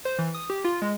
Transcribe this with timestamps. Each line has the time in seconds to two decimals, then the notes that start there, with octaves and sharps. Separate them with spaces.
0.05 C5
0.19 E3
0.34 D#6
0.50 G4
0.64 F4
0.82 G#3